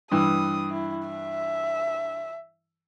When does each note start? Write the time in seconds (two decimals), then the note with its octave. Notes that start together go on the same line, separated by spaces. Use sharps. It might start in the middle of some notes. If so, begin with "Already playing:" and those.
0.11 G2 E3 D#6
0.71 E4
1.08 E5